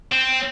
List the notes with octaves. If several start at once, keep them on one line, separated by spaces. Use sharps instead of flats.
C4